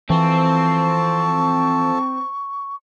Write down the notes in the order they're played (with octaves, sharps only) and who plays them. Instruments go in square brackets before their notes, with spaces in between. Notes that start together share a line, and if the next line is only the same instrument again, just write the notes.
[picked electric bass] E3 [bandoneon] F3 A4 A5 [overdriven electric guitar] C4 [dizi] C#6